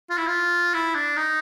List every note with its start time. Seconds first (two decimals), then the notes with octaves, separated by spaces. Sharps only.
0.10 F4
0.18 E4
0.27 F4
0.74 E4
0.95 D4
1.17 D#4